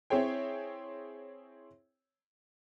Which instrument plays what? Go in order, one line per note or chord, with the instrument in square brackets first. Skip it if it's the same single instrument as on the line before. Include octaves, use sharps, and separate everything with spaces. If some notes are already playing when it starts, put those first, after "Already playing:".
[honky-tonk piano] C4 E4 G#4 C#5 G5